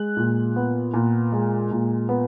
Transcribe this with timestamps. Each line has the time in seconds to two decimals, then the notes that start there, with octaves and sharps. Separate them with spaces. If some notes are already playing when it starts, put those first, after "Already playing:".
Already playing: G#3 F#6
0.17 A#2
0.56 B3
0.94 A#2
1.33 G#3
1.71 A#2
2.09 B3